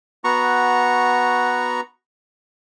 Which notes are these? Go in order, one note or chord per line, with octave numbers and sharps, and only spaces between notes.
B3 F#4 A#5 C#6